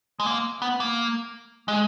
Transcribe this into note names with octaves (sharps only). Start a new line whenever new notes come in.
G#3
A#3
B3
A#3
G#3